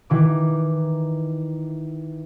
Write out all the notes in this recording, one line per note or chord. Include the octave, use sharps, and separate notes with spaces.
D#3 E3 D6